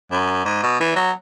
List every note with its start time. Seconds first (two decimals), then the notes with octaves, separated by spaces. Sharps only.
0.11 F#2
0.45 G#2
0.62 B2
0.80 E3
0.95 F#3